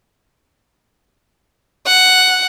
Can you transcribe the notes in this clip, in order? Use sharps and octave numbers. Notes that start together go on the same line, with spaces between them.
F#5